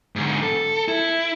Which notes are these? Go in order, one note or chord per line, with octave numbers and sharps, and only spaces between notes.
G#2 D3
A4
E4